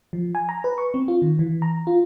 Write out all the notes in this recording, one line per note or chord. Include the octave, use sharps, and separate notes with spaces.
F3
G#5
A#5
B4
C#6
C4
F4
D#3
E3
A#5
F4